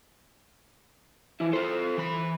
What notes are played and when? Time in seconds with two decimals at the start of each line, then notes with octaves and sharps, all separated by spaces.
1.40 E3 F3 E4
1.53 F4 A4 C5
1.98 E3 B5